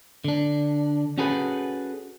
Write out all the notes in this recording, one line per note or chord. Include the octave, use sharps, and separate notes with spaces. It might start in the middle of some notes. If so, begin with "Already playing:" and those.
D3 D4
C#4 F#4 G#4 A4 B4